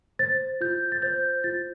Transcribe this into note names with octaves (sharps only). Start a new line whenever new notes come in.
C5 A6
F4 G6
A6
C5 G6
F4 A6